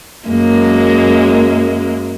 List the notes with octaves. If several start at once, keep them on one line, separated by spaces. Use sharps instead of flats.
F#2 G#3 A#3